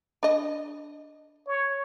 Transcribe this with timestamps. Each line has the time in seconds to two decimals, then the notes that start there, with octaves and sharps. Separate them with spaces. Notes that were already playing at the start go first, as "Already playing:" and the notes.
0.23 D4 D#5
1.47 C#5